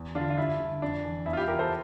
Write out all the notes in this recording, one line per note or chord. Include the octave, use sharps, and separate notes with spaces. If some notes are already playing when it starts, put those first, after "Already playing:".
Already playing: E2
D3 D4 F4
F4
G2 E4
D3
F2 D4
E3
E2 E4
F4
E4 G4
E3 G4 A#4
A4 C5